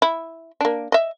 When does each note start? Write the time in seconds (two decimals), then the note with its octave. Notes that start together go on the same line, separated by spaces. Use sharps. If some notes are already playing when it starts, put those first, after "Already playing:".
0.02 E4
0.61 A#3 D4
0.92 D#5 E5